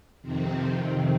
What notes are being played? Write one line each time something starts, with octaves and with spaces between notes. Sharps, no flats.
F2 C3 D#3 C4